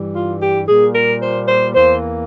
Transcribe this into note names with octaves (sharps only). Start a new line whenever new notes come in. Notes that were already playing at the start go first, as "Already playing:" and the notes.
Already playing: G2 E3 G3
F4
G4
A#2 G3 A#3 G#4
A#4
C5
C5
E2 E3 A#3 C5